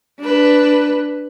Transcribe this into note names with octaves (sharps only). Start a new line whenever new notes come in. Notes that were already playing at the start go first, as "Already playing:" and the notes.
D4 B4